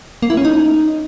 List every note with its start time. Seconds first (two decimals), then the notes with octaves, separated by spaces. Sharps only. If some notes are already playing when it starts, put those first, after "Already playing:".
0.22 A#3
0.30 E4
0.37 C#4
0.45 D#4